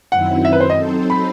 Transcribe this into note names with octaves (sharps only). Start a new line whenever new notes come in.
F#2 D#3 F#3 C4 E4 F#5
E5
B4
C5
D#5
F#3 C4 D#4 A4 C5
B5